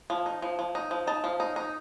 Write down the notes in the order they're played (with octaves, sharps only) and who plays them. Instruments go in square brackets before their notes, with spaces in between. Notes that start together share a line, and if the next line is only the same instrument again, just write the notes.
[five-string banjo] F3
D#4
F3
F3
D#4
F3
D#4 A5
F3
D#4
D#4